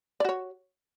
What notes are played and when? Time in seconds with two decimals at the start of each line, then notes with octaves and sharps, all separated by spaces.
0.20 D5
0.25 F#4
0.29 C#5